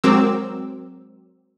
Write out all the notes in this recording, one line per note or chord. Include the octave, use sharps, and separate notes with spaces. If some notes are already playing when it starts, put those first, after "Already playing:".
F#3 G#3 C4 A#4 D6 E6